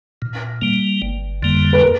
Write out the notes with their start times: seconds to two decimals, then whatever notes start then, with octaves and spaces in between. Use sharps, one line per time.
0.22 A#2
0.62 G3 A#3
1.02 G1
1.43 F2 D3 G3 A#3
1.73 B4
1.82 A#4